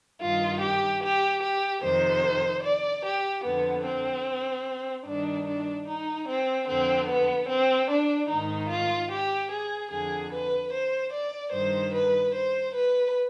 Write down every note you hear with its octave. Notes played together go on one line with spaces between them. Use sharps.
G2 D#3 F4
G4
G4
G4
F2 C3 D#3 C5
D5
G4
F2 D3 B3
C4
G2 D#3 D4
D4
D#4
C4
F2 D3 C4
B3
C4
D4
G#2 D#3 D#4
F4
G4
G#4
F2 D3 G#4
B4
C5
D5
G2 D#3 C5
B4
C5
B4